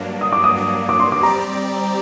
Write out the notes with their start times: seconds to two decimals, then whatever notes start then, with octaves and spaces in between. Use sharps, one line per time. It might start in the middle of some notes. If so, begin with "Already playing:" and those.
Already playing: G2 F#3 A#3 D4
0.21 D#6
0.33 D6
0.44 D#6
0.56 G2 F#3 A#3 D4
0.89 D6
1.00 C6
1.12 D6
1.22 G3 C4 G4 D5 A#5